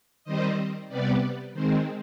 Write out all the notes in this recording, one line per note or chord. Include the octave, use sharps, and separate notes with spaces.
D#3 G3 C4 C5 D#5
C3 G3 B3 B4 D5
D#3 G#3 C4 C5